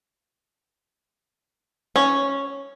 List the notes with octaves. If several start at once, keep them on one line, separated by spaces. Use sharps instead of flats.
C#4